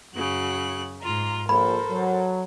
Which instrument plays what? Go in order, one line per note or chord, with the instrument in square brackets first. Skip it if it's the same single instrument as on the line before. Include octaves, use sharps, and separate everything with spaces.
[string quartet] F#2 C#3 F#6 [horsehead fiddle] F#4
[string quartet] G#2 F4 [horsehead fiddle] A#5
[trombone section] A#1 [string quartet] A4 [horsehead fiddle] A#4 C5 [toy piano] B5
[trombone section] F#3